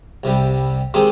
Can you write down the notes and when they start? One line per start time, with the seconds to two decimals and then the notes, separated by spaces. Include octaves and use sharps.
0.24 C2 C3 G3
0.94 D#3 G#3 C4 D#4 G4